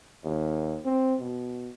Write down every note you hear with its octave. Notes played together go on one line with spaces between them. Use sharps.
D#2
C4
B2